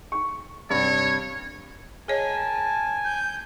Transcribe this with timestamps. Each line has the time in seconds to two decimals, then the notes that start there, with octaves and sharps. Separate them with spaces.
0.12 C#6
0.70 G2 C3 C#5
2.08 G#4 A#4 C#5 D#5 G#5 A5
3.05 G6